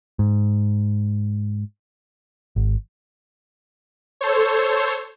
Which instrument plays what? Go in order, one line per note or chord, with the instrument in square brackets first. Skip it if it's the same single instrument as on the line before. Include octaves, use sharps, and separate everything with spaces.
[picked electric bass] G#2
G#1
[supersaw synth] A4 C5 C#5